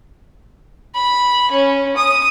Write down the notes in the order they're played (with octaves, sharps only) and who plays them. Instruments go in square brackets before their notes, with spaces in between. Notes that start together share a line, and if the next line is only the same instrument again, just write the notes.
[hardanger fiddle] B5
C#4
D#6